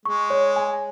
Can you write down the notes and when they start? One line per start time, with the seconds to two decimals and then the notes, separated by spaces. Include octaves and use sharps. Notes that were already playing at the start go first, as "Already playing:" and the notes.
0.05 G#3 C#6
0.30 C#5
0.56 G#5